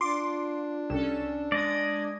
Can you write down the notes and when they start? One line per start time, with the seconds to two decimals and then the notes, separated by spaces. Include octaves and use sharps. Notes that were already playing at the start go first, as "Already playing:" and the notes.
0.01 D4 F4 C6 D6
0.90 C2 C#4 A4 E7
1.52 G#3 D5 D#5 D#6 G#6